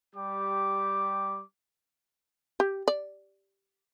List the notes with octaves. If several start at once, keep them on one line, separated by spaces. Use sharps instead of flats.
G3 G4 D6
G4
D5